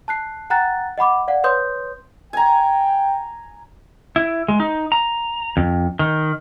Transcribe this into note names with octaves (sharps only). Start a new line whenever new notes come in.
A5 F#6 C7
F#5 G5 A#5 F#6 A6
D#5 F#5 B5 D6
D5 F5 F#5
B4 C#5 C6 D#6 G6
G5 G#5 A#5
E4
G#3
D#4
A#5
F2
D#3